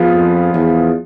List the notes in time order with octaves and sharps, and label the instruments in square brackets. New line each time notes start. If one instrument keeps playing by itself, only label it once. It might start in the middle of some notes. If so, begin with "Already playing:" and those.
Already playing: [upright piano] F3 B3 F4 G#4
[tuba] F2
E2